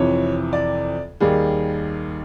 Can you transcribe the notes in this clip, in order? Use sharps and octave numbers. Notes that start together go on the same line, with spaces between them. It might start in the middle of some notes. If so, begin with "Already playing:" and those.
Already playing: F2 C3 E3 C#5
D5
D#2 D#3 G3 G#4